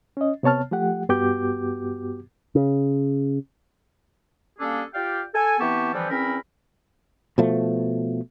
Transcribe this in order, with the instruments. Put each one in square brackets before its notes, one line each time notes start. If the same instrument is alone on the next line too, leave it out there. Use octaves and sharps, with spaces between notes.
[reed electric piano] C#4 D#5
C3 B3 C#5 A5 F6
F3 A3 G4 F#5
G2 B3 F#4 G4 D6 G6
[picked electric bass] C#3
[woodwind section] G3 A#3 C#4 D4 G#4 A4
F4 G4 D5 F5 G5
A4 G#5
E3 B3 C4 G4 A5 C#6
D3 E3 F3 G3 B3 C4
E2 C4 C#4 A#4 B5
[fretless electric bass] B2 F3 A3